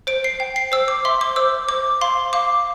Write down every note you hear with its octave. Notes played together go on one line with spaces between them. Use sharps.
C5 D7
C7
G5
C7
C5 E6
D6
E5 C6
D6
C5 E6
C5 D6
F5 C6
F5 D6